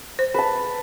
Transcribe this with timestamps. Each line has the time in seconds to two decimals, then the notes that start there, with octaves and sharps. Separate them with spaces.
0.19 C5
0.34 G#4 B4 A5